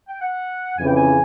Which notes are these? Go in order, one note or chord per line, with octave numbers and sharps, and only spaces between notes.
G5
F#5
F2 C#3 E3 G#5
G5
G#5